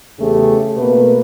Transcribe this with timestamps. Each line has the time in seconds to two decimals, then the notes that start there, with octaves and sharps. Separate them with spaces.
0.19 E2 C#3 A3 G4 G#4
0.77 B2 A3 A#3 B4